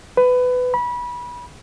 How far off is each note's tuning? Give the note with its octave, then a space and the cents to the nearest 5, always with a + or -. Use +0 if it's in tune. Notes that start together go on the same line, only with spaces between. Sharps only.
B4 +20
B5 -25